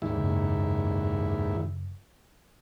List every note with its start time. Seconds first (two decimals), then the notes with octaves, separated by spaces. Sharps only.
0.02 D#2 G#2 E4
0.17 F#1